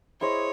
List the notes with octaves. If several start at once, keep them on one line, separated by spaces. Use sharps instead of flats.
E4 G#4 C5 C#5 D#5